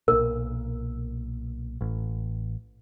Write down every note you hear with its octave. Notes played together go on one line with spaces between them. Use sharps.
B1 A#2 A#4
A1